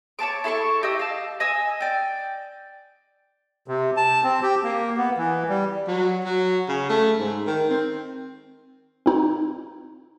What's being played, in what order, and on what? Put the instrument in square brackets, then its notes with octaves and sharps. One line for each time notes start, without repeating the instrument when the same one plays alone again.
[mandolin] C#5 F5 A5 D6
E4 A4 C6 C#6
G4 D#5 E6
F5 A5
D#5 G#5 E6
D5 G5
[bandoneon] C3
A5
C4
G4
A#3
B3
E3
G3
[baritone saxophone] F#3
F#3
C#3
A3
G#2
D#3
C4
[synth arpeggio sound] C4 D#4